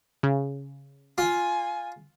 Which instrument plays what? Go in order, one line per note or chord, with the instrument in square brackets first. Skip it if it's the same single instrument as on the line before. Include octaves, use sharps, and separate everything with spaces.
[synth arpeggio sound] C#3
[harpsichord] F4 [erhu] G#5